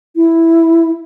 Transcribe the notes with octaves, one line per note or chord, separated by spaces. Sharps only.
E4